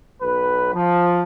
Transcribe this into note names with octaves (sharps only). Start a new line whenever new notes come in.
B1 B4
F3